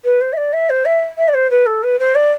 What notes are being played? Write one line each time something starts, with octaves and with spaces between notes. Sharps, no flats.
B4
C5
E5
D5
E5
C5
E5
E5
D5
C5
B4
A4
B4
C5
D5